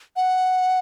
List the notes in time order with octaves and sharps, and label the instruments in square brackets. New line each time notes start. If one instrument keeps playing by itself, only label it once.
[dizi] F#5